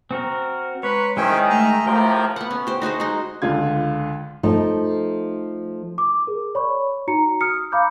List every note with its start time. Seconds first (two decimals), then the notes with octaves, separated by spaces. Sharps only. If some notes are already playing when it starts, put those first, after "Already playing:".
0.11 C4 F#4 A#4
0.83 G#3 B4 C#5 A#5 C6
1.17 D#3 G#3 C#4 E4 G#4 C5 E5 G5
1.50 A3 D#5 E5 A#5
1.86 A2 C3 F3 G4 A#4 G5
2.36 B3 F#5
2.51 C#4
2.67 G4 C5
2.82 D#4 F#4 G#4 C5
3.00 G#3 D#4
3.42 C#2 D3 F4 G#6
4.43 F3 A3 D#4
5.98 D6
6.27 G#4 A#4
6.55 C#5 D5 B5 C#6
7.07 D#4 F#4 A#5 C#7
7.41 D#6 F6 C#7
7.72 F5 A#5 B5 D6 G6